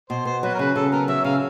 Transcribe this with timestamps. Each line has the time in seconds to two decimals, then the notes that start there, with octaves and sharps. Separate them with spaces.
0.10 B2 C5
0.25 B3 C5
0.43 F#3 B4
0.54 A#4
0.59 C#3 B4
0.75 C#3 A4
0.92 B3 A#4
1.08 F#3 E5
1.24 C#3 F5